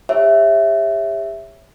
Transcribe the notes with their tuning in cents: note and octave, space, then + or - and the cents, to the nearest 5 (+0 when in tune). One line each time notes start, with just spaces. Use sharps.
G4 +40 C#5 +0 E5 +0